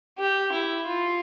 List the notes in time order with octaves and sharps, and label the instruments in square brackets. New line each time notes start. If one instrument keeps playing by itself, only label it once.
[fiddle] G4
E4
F4